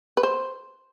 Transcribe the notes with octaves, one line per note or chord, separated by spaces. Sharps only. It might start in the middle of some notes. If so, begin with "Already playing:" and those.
B4
C5